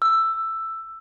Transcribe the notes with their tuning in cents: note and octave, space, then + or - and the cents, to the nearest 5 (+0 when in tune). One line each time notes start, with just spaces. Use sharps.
E6 +10